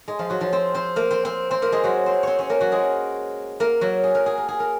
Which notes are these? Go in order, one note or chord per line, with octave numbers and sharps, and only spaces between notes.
G#3 G#4
F3 F4
F#3 F#4
F3 F4
C4 C5
C4 C5
A#3 A#4
C4 C5
C4 C5
C4 C5
A#3 A#4
G#3 G#4
F#3 F#4
C4 C5
C4 C5 C#5
C#4 C#5
A#3 A#4
F#3 F#4
G#3 G#4
A#3 A#4
F#3 F#4
G#4
A#4
G#4
A#4
G#4
A#4